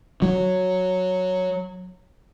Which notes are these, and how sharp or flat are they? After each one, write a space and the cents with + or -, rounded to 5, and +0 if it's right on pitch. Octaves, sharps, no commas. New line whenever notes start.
F#3 -5